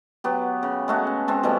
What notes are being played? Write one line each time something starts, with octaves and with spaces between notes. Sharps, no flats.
F#3 B3 G4
C#3
G#3 A3 F#4
C#4
G#3 C4 A5
B2 F3 G3 A3